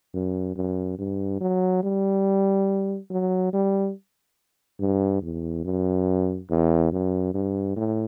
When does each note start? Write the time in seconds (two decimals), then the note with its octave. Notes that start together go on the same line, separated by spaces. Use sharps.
0.14 F#2
0.56 F#2
0.98 G2
1.41 F#3
1.83 G3
3.11 F#3
3.53 G3
4.80 G2
5.23 E2
5.64 F#2
6.50 E2
6.92 F#2
7.34 G2
7.76 A2